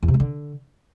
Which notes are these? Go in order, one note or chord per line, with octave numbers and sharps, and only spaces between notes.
E2
C3
G#3
D3